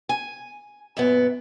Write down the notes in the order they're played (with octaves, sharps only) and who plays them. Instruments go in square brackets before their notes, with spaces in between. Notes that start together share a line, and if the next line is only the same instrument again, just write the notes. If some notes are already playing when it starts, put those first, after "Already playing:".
[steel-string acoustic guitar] G#5
F#2 A#2 B3